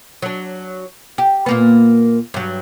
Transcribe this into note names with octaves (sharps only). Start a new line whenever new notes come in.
F#3 D4
G4
A#2 A#3 B3
G2 F#3